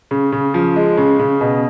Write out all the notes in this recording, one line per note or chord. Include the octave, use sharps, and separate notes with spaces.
C#3
C#3
F3
G#3
C#3
C#3
B2